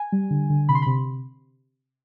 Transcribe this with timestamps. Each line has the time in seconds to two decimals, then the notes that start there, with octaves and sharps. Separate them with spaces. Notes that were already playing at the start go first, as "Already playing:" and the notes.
Already playing: G#5
0.12 G3
0.30 D3
0.50 D3
0.69 C3 B5
0.75 C6
0.82 C3 B5